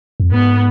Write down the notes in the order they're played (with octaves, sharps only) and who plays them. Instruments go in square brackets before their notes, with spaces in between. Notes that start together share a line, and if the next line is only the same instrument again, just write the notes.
[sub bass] F2
[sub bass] G#2 [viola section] B3